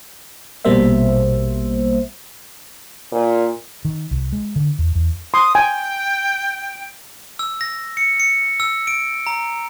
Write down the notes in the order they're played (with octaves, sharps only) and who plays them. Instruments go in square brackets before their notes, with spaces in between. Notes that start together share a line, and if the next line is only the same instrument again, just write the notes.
[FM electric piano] A#1 B2 G3 A#3 C5 E5
[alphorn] A#2
[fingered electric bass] D#3
C2
G#3
D3
E2
E2
[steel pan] C6 [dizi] D#6
[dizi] G5 [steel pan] G#5
[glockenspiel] E6
A#6
C#7
C#7
E6
D7
A#5